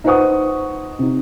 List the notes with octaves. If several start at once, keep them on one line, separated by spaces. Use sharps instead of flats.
D#4 B4 C5 F#5 C#6 D#6
C3 D#4